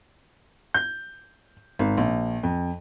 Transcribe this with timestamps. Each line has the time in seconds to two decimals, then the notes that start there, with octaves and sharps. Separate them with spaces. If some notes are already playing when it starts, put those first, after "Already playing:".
0.74 G6
1.79 G#1
1.97 A#1
2.43 F2